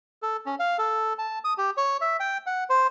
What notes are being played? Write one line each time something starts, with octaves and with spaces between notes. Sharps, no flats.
A4
C#4
F5
A4
A5
D#6
G4
C#5
E5
G5
F#5
C5